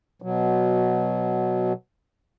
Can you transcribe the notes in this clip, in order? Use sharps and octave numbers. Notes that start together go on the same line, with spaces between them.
B2 F#3